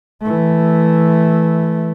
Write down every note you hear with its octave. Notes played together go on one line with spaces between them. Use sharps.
E3 A3